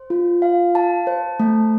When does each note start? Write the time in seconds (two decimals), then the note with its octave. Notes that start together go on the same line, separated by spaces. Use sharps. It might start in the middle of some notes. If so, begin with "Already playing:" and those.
Already playing: C5
0.10 F4
0.42 F5
0.75 A5
1.07 C5
1.40 A3